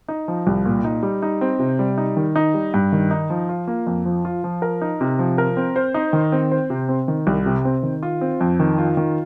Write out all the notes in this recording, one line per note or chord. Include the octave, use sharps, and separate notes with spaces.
D#4
F3
C2
A#2
D#4
G3
D#4
C4
C3
G3
D#4
D#3
D#4
G3
G2
D#3
D#4
F3
F4
A#3
F2
F3
F4
F3
A#4
D#4
C3
F3
A#4
C4
C5
D#4
D#3
C4
C5
C3
C4
D#3
C2
C3
C4
D#3
F4
C4
F2
D#3
F4
D#3